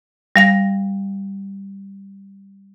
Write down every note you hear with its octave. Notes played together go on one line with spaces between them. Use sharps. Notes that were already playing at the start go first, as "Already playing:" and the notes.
G3 F5 A#6